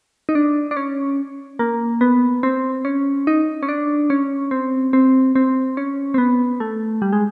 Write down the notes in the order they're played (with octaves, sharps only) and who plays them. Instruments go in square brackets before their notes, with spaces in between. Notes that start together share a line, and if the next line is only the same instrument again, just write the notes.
[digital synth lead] D#4
D4
D4
C#4
A#3
B3
C4
C#4
D#4
C#4
D4
C#4
C4
C4
C4
C#4
C4
B3
A3
G3
G#3